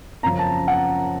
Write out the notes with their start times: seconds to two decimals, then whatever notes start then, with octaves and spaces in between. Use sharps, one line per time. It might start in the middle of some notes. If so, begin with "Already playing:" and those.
0.23 F#2 C#3 F3 A#5
0.39 A5
0.68 F#5